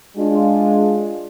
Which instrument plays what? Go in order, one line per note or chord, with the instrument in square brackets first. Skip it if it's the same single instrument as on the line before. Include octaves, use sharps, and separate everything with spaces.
[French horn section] G#3 D4 F4